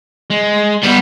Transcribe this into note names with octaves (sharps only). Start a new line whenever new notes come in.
G#3
G3 B3